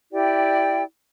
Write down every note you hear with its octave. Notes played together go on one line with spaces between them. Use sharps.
E4 G4 D5 G5